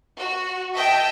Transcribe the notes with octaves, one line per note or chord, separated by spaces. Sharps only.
F#4
D#5 E5 G5 A5